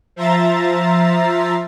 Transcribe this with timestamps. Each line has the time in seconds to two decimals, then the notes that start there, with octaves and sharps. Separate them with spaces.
0.16 F3 E5 A#5 C6 A6